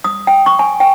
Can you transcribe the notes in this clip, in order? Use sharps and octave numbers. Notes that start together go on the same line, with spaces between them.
D#6
G5
C#6
G#5
G5